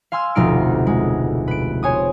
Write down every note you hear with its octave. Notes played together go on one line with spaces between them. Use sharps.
F5 G#5 C6 E6 F6
F1 D2 B2 D#4 F6 D7
G#3
B4 D7
C5 C#5 G#5 D#6